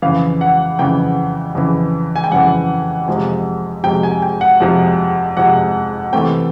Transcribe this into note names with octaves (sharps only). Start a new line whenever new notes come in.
F2 C#3 E3 F5
F#5
F2 C#3 E3 G5
F2 C#3 E3
G#5
G5
F2 C#3 E3 F#5
F2 C3 F3 G#3
F2 C3 F3 G#3 G5
G#5
G5
F#5
F2 C3 F3 G#3
F2 C3 F3 G#3 F#5
C3 E3 A3 C4 G5